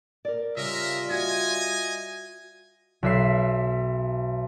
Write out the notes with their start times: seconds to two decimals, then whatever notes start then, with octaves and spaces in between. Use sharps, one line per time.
0.25 A#4 D5
0.57 C#3 G3 F4 A#4 D#5 E5
1.11 F#4 D#5 E5 G#5
3.03 B1 E5 C7